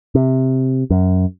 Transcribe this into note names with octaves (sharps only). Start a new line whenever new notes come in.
C3
F#2